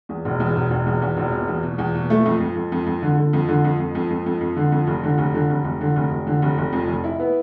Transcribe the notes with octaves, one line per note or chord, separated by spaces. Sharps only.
E2
E1
E2
E1
E1
E2
E2
E1
B2
E2
B2
E2
B2
A3
F2
F2
F2
F2
F2
D3
D3
F2
D3
F2
F2
F2
F2
F2
F2
D3
F2
F1
D3
F1
D3
F1
F1
D3
F1
F1
D3
F1
F1
F2
F1
E4
B3